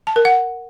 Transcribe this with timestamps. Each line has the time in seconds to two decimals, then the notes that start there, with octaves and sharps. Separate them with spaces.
0.07 A5
0.16 A#4
0.25 F#5